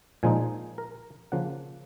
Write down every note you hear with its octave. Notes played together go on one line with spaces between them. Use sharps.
A#2 F3 G#3 D#4 G#5
A#4
C#3 F3 A#3 F#5